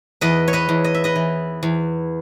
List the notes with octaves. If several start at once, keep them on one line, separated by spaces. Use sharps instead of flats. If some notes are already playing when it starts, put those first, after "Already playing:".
E2 B4 D#5
C#5
B4 D#5
E2
D#5
E5
B4 D#5
E3
E2